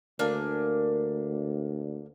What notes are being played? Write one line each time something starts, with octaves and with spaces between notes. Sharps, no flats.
D2 A#3 D4 G#5